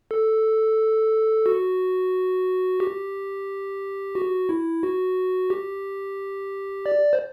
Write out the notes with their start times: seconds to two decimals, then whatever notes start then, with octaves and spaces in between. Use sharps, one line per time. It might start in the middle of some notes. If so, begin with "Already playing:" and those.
0.11 A4
1.46 F#4
2.80 G4
4.15 F#4
4.49 E4
4.83 F#4
5.50 G4
6.86 D5
7.13 C5